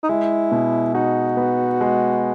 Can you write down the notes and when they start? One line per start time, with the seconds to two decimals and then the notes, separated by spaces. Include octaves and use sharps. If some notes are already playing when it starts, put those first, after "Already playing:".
0.03 D#4
0.09 G#3 E4
0.51 B2
0.94 D#4 F#4
1.37 B3
1.81 G#3